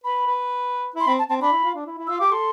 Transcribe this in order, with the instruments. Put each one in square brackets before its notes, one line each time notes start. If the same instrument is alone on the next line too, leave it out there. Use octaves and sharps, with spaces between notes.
[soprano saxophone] B4 [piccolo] B5
[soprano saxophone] B4
E4
[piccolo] C6
[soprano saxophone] C4 [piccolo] B5
[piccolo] A5
[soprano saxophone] C4 [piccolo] A5
[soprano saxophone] D4 [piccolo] B5
[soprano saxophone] E4
F4
D4
E4
E4
[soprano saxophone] F4 [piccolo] E6
[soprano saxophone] G4 [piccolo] D6
[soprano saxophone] A4 [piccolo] C6